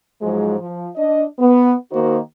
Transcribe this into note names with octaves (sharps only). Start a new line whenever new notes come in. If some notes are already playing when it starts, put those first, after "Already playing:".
G#2 F3 F#3 G#3
F3
D4 D#5
B3
D#3 A#3 D#4 F#4 C5